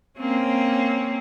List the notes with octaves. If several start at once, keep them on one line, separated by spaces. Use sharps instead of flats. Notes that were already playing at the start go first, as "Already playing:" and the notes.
A#3 C4 C#4